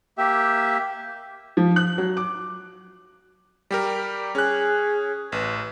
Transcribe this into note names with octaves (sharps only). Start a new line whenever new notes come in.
A#3 G4 E5
F3
F#6
F#3
D6
G3 G4 A#4
C#4 G#4 F#6
A1 B4